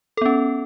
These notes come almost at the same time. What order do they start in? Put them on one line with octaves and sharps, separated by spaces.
A4 B3 C#4